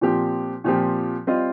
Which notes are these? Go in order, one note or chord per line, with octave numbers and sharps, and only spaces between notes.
A#2 F3 C4 G4
A#2 F3 C4 G4
G3 C4 F4 D#5